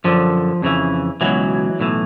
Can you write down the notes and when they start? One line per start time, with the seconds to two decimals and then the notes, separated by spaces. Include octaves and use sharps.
0.04 F#2 D3 F3
0.62 F2 C#3 E3
1.21 C#2 B2 E3 F#3
1.80 B1 A2 E3